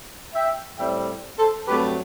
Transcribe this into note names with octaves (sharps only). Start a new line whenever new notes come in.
E5 G5
A2 G3 C4 E5 G5
A4 C5
G2 F#3 A3 C4 G4 B4